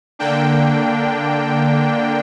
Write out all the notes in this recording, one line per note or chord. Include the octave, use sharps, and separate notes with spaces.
D3 A#3 D4 G5